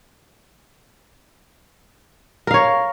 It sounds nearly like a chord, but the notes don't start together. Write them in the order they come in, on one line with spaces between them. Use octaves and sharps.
A#4 F5 C#5